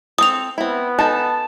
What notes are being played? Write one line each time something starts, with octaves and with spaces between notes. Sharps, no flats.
C4 A4 D#6 F7
B3 C4 E4
D#4 A5